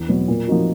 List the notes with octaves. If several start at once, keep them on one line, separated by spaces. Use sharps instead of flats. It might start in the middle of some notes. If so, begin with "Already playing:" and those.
Already playing: E2
B2 F#3 B3
A#2
F3 A#3 D#4 F#4